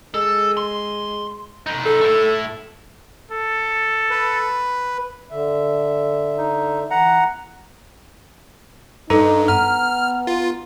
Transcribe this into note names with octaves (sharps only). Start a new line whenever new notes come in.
G#3 A4
C6
D#4 B4
A4
A3 E4
A4
B4
D3 E5
D#4
E3 B4 F#5 A#5
G2 D#4 A4 B4 A#5
B3 F#5 A#5 F6
F4